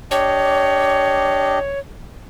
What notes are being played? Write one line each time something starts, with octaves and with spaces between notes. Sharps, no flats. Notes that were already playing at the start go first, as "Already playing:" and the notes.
D4 G4 C#5 D#5